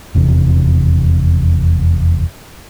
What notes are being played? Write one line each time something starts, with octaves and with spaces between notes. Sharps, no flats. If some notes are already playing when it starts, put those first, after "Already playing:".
F1 E2 C3